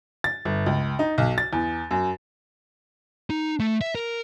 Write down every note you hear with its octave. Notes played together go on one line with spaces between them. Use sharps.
A6
G1
C#2
D#4
B1
A6
E2
F#2
D#4
A3
E5
A#4